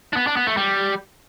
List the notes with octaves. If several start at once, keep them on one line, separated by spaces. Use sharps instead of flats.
D4
B3
D4
B3
A3
G3